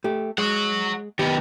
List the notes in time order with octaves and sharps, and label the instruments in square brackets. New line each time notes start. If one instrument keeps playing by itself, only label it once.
[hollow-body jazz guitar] A3 G4
[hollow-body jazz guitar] G#3 [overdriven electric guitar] C#5 F#5
[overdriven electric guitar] D#3 B3 [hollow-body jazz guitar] G4